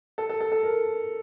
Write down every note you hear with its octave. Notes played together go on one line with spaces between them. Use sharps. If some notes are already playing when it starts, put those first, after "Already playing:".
A4
A4
A4
A4
A#4